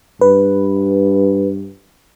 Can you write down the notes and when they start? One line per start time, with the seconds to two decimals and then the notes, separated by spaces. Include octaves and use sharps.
0.21 G2 B4